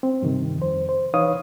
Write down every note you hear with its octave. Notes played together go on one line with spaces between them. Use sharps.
C4
G2 C3 D#3
F2 C5
C5
E3 D#4 B4 C#5 F5 D#6